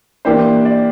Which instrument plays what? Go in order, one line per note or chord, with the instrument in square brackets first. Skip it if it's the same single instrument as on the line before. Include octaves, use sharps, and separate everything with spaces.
[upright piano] E3 A#3 D4 G4 [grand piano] C5
[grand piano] D5